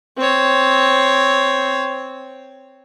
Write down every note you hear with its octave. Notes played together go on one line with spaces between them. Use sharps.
C4 C#5